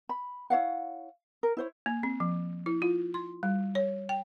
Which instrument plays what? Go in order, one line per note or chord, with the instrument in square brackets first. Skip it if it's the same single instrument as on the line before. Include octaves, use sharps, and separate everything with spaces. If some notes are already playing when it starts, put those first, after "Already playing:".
[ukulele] B5
E4 C#5 F5 F#5
A#4
E4 C5 C#5
[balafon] A#3
C4
F3
E4
F4
C6
G3
C#5
G5